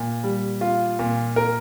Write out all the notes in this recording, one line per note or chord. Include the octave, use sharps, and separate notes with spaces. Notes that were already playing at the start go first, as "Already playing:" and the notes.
Already playing: A#2
G3
F4
A#2
A#4